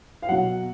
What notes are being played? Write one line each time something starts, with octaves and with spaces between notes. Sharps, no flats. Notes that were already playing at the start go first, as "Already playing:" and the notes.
F5
B2 F#3 F#5